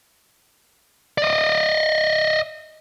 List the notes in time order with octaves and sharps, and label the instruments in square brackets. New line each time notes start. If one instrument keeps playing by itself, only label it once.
[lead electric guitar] D5 D#5